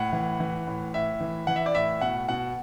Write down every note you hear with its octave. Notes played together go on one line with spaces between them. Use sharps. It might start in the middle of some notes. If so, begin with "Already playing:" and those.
Already playing: A2 F#5
E3
E3
A2
A2 E5
E3
E3 F#5
E5
D5
A2 E5
B2 F#5
B2 F#5